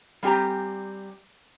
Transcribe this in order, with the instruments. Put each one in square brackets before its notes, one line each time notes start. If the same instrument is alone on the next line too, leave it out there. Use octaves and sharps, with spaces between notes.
[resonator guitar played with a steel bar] G3 C4 G4 G#5 A#5